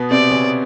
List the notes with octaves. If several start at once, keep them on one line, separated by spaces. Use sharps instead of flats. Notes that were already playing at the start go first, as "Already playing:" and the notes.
Already playing: B2 B3
C3 C4 D5
C#3 C#4